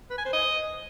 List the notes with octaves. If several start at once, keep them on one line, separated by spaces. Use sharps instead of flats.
B4
G#5
C5
D#5